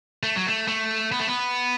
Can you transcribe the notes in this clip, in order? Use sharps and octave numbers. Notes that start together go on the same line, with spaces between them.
A3
F#3
A3
A3
B3
A3
B3